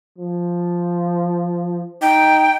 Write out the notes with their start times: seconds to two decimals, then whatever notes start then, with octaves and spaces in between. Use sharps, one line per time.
0.18 F3
2.02 D#4 G5